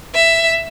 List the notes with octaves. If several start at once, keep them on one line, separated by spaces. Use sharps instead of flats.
E5